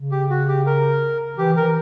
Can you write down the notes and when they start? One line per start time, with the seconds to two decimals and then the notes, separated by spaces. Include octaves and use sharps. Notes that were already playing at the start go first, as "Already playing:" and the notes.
Already playing: C#3
0.12 G4
0.30 F#4
0.48 G4
0.66 A#4
1.38 E3 G4
1.57 E3 A#4